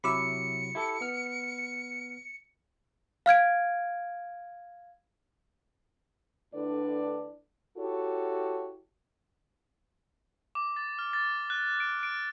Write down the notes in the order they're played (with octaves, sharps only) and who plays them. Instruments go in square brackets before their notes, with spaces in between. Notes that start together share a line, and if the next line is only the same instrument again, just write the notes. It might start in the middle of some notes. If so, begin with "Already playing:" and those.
[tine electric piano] C3 F#3 E4 [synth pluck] B5 D6 E6 [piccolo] C#7
[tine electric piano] E4 G4 A4
B3 F6
[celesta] F5 F6 G#6 D7
[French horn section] A2 D3 D4 B4 D5
E4 F#4 G4 A4 C#5
[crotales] D6
A6
F6
A6
F#6
D7
D7